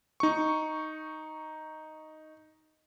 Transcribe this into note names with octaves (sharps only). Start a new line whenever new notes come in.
D#4 C#6